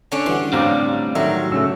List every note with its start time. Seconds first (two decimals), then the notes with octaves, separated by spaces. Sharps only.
0.12 D3 C#4 D4
0.26 E3 G3 F#4 C6
0.53 A2 G3 C4 D4 D5 F5 A#5
1.15 D#3 F#3 A3 E5 A#5 C6
1.52 C#3 A3 C#4 E6